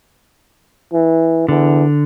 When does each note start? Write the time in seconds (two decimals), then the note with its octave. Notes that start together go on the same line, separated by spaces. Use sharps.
0.93 E3
1.49 E2 D3